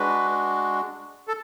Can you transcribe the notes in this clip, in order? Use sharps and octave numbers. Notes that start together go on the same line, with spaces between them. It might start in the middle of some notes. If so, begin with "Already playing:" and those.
Already playing: G#3 D4 F#4 B4
A4